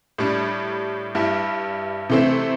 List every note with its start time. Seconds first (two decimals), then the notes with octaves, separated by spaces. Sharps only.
0.18 A2 G3 D4
1.15 G2 G3 E4
2.10 C3 E3 A3 C4 E4